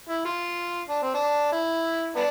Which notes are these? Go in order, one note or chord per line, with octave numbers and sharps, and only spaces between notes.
E4
F4
D4
C4
D4
E4
B3 D4